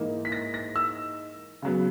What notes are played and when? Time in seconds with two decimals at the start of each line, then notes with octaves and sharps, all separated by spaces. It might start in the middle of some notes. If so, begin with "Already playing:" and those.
Already playing: G#2 E3 A#3 D#4
0.25 B6
0.32 A#6
0.54 A#6
0.76 E6
1.62 C#3 F#3 B3